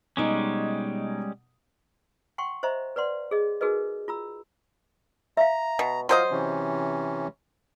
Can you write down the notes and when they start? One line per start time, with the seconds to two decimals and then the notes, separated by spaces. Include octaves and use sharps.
0.17 B2 G3 G#3 C#4 D#4
2.38 F#5 G5 C6 C#6
2.63 C5 D#5 E5 A#5
2.96 B4 D5 F#5 C6
3.31 G#4 D#5
3.61 D#4 F#4 G#4 A#4 B4 D#5
4.08 F4 A#5 E6
5.37 E5 F5 A#5
5.79 B2
6.09 F#3 F4 C5 D#5 C6
6.31 C3 E3 C#4